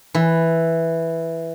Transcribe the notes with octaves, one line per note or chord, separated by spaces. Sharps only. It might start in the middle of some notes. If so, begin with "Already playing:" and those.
E3